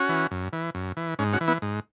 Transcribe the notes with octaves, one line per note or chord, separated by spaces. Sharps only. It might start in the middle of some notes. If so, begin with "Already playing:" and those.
Already playing: C#4 F#4
E3
F#2
E3
F#2
E3
G#2 C#4
C#4 F#4
E3
B3 E4
G#2